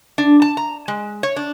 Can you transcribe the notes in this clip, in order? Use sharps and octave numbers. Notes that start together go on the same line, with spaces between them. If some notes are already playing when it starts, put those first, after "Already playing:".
D4
A5
A#5
G#3
C#5
D4